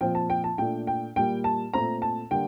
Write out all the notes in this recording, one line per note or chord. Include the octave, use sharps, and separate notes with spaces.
A#2 F3 C4 G5
A5
G5
A5
A#2 A3 D4 G5
G5
A#2 G3 A#3 G5
A5
A#2 A3 C4 A#5
A5
D3 G3 A#3 G5